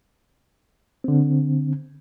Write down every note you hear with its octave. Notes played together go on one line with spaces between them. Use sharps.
D3 C4